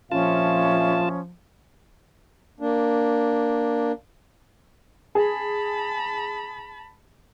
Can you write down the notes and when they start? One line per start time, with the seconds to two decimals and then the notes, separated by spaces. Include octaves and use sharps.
0.12 A#1 A#2 F3 C#4 F4 E5 A5
2.60 A#3 D4
5.15 G#4 A5 B5